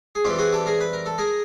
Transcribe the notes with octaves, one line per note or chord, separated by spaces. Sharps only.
G#4
E3 G3 C4 F4 G4
F#4 G#4
G4 A4
G#4 A#4
B4
A#4
A4
G#4 A#4